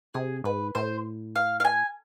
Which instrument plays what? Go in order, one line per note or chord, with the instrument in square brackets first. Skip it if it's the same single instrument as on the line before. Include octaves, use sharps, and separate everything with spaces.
[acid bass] C3 [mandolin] G#4
[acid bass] G#2 [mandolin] B4
[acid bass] A2 [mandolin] C5
[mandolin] F5
F5
G#5